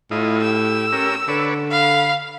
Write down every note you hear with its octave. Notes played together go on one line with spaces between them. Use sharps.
A2 E4 F4 D#5
G4 E6
C#4 G4 A#4
D3 B4 C#5 D5
F5 B5